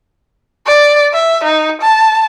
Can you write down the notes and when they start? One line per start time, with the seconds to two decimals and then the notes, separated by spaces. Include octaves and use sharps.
0.67 D5
1.14 E5
1.44 D#4
1.81 A5